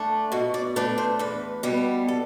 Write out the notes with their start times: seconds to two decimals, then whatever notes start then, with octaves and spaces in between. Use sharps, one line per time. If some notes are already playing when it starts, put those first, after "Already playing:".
Already playing: A3 D4
0.32 B2 F#4
0.54 D5
0.76 A3 D4 B4
0.98 C5
1.19 E2 B4
1.63 B2 G3 B3
2.08 A4